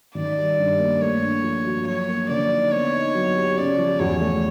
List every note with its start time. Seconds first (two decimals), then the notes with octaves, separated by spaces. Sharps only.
0.15 D#3 D5
0.37 G3
0.58 G2
0.79 A#3
1.01 A3 C#5
1.22 D4
1.43 F3
1.65 F#4
1.86 F#3 C#5
2.08 A#3
2.29 D3 D5
2.51 D#4
2.71 B3 C#5
2.93 D#4
3.14 F#3
3.36 G4
3.57 C#3 D5
3.78 F3
3.99 E2 C#5
4.21 A3